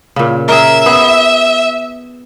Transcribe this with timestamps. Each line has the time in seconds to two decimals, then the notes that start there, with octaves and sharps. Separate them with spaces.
0.16 A#2 C#3
0.49 G#4 A#4 E5
0.86 B3 G#4